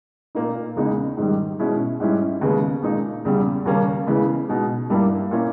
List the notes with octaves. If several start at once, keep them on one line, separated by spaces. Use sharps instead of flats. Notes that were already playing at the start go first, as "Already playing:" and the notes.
A#2 A#3 D#4
E2 C#3 G#3 D#4
G#2 D#3 G3
B2 G#3 C#4 E4
G#2 G3 C#4 E4
D#2 C#3 G#3 B3
A#2 G#3 D#4
E2 C#3 G3
D#2 C#3 G3 A#3 C#4
C#3 E3 G#3 B3
B2 G#3 D#4
G2 G3 A#3 E4
A#2 A#3 C#4 E4